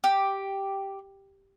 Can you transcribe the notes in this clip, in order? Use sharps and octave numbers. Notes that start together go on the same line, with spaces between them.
G4